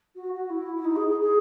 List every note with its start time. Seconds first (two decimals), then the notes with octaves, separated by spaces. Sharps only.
0.15 F#4
0.33 F#4
0.50 E4
0.76 E4
0.84 D#4
0.96 G#4
1.08 G#4
1.20 G#4